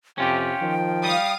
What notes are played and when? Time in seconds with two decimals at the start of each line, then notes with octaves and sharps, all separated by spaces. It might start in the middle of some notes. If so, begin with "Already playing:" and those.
0.18 F2 C3 C#4 F4 G4 G5
0.62 D#3 F3
1.04 G3 F5 D#6